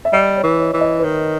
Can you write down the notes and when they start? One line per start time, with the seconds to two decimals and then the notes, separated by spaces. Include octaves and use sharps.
0.05 E5
0.13 G3 D#5
0.37 C#5
0.43 E3
0.59 C#5
0.74 E3
0.81 D#5
1.00 B4
1.04 D#3 C#5